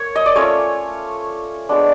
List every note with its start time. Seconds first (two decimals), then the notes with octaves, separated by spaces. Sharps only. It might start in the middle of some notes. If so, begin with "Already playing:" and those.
Already playing: A#3 C#5
0.16 D#5
0.26 D5
0.35 A3 C#4 F4 C#5
1.69 G#3 B3 D4